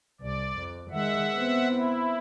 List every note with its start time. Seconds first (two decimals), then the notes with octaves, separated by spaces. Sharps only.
0.21 C2 D5
0.58 F2
0.91 D#3 G#3 E5 F#5
1.35 B3 C4
1.70 E4